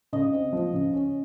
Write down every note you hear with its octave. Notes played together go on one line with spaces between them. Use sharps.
C#3 D#5
C4
F3
C#3
C#4